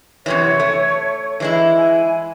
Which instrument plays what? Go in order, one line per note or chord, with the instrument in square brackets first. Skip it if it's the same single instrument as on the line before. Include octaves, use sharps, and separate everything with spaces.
[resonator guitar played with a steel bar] F#2 C3 E3 [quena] C#5
[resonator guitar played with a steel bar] A3
E3 G#3 E4
[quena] G#5